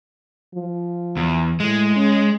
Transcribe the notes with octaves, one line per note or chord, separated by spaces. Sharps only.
F3
E2
A2 G#3
C#4